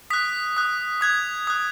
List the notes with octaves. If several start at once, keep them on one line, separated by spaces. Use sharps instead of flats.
D#6 F#6 B6
D#6 F#6
D#6 F#6 G#6
D#6 F#6